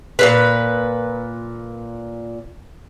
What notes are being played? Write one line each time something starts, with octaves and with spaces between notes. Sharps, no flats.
A#2 C#3 B4